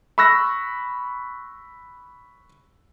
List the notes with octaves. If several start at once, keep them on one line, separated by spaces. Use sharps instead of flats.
B5 C#6 E6 F#6 A#6